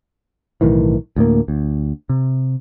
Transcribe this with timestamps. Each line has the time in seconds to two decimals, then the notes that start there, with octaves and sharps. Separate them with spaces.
0.61 B1 A2 D#3 E3
1.16 D2 A2 A#3
1.48 D2
2.09 C3